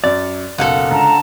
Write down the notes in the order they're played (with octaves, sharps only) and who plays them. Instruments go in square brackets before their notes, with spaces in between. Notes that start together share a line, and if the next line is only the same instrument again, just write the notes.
[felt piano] F#2 [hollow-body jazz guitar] D5
[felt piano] F#1 B1 [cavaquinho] A4 F5 F#5
[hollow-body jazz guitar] C#2 [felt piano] D3 [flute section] A5 A#5